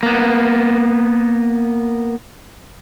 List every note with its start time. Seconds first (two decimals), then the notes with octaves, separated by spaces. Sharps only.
0.03 A#3 B3